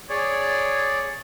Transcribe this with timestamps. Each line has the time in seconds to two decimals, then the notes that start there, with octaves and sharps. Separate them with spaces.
0.09 G#4 C#5 D5